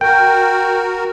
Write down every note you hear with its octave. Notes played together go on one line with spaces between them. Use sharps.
F#4 A#4 G5